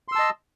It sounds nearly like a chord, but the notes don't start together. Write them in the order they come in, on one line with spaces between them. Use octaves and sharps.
C6 E6 A5 D#5